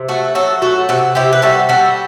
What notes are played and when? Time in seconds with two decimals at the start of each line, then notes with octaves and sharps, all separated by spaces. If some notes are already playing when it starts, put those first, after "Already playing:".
Already playing: C3
0.08 A3 F#4 A4
0.35 F#3 F#4 A4
0.62 A3 F#4 A4
0.89 C3 F#4 A4
1.15 C3 E4 G4
1.33 B4
1.42 G3 F#4 A4
1.69 G3 F#4 A4